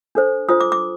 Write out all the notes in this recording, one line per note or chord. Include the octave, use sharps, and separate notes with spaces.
D4 A4 C5
D4 F4 C5 D#6
D6
D6